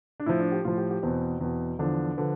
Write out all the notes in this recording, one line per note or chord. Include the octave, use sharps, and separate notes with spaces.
D4
A2 F3 E4
D4
G4
A2 F3 F4
G4
G4
E2 B2 C4
E2 B2
E2 D3 F3 D4
D3 F3 B4